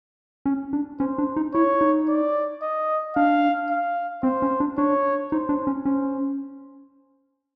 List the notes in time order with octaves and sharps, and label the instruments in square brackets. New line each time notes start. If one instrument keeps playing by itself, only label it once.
[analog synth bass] C#4
D4
[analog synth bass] C#4 [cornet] C5
[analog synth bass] D4
D#4
[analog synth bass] E4 [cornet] C#5
[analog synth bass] D#4
[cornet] D5
D#5
[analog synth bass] D4 [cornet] F5
[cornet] F5
[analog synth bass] C4 [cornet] C5
[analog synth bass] C#4
D4
[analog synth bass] D4 [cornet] C#5
[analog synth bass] D#4 [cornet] C5
[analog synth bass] D4
C#4
[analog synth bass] C#4 [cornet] C5